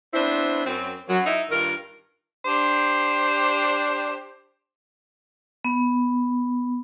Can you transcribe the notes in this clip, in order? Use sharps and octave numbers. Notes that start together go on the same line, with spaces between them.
B3 C4 D4 E4 C5
F#2 C4
F#2 F#3
D#4 E4
G2 D#3 F4 A#4
D4 G4 C5
B3